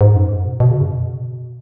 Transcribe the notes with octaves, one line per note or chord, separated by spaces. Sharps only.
G#2
F#2
G#2
B2
B2
C#3
F#2
B2